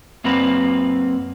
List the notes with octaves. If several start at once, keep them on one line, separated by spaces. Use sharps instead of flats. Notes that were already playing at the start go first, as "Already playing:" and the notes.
F#2 A#3 C4 B4